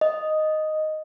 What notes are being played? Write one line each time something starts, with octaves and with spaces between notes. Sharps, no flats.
D#5